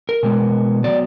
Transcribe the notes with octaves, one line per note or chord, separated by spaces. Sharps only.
A#4
B2 G#3 B3
D#3 F#3 B3 D5